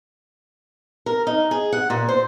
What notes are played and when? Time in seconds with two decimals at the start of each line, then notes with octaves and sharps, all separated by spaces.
1.06 A#4
1.27 D#4
1.51 G#4
1.72 F#5
1.90 A#2
2.08 C5